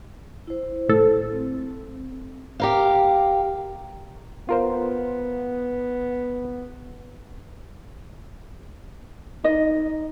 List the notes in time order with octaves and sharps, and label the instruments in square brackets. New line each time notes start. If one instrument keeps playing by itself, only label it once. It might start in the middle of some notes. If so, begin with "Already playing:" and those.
[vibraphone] E4 C5
[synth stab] A2 A4
[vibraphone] C4
[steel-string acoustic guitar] G4 A#4 F5
[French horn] B3 [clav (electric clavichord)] F4 A#4 C5
[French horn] D#4 [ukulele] D#5